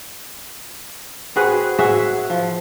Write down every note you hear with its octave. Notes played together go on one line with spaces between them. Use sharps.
C4 F#4 G#4 B4
F#4 G#4 E5
F3